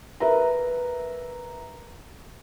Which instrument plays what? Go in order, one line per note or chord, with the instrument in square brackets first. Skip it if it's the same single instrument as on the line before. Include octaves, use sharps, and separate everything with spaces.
[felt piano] A#4 B4 E5 A#5